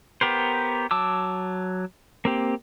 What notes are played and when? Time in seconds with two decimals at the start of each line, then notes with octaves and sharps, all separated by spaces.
0.21 B3 G4 A#4 C5
0.91 F#3 A5 D6 E6
2.25 A#3 C4 G4